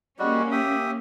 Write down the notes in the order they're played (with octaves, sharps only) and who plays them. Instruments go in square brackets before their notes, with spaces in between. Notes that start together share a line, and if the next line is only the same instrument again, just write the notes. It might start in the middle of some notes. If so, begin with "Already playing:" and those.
[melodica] G3 G#3 F#4 [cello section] A#3 C#4
[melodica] G4 E5 D#6